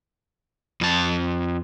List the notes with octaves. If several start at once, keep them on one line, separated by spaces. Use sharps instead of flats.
F2 A5